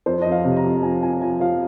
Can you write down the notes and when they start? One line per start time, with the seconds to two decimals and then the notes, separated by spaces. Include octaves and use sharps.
0.06 F2 C5
0.22 F2 D#5
0.32 F5
0.44 C3
0.57 A#5
0.64 F2
0.82 F3 G#5
1.02 F2 G#5
1.21 F3 G#5
1.40 F3 F5